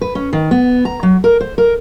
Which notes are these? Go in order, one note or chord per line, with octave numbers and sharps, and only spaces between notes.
B4
C#4
D#3
B3
A#5
F#3
A#4
C5
A#4